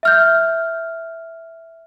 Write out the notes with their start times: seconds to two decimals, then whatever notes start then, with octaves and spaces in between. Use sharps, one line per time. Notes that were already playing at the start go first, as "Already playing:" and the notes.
0.03 E5 F6 G6